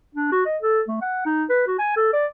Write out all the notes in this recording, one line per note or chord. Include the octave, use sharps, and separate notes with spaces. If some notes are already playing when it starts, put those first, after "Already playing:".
D4
F#4
D#5
A4
A3
F#5
D#4
B4
F#4
G#5
A4
D5